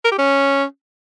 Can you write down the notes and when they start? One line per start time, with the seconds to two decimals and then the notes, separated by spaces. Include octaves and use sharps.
0.04 A#4
0.11 G4
0.18 C#4